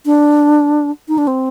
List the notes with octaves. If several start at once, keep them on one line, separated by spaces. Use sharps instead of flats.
D4
D#4
D4
C4